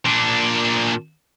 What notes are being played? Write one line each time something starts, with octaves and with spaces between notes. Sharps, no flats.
A#2 D4